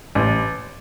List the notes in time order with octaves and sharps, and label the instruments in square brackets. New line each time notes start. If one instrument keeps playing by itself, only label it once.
[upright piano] A1